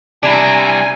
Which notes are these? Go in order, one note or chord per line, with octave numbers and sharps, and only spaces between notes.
C3 G3 D4 E4 G#5 A#5